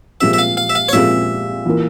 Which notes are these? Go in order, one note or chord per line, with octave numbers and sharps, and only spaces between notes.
A#2 F3 G#3 C4 G4 E5
E5
F5
F5
E5
F5
C#5
A#2 F3 G#3 C4 G4 E5
E3 A#3 F4 A#4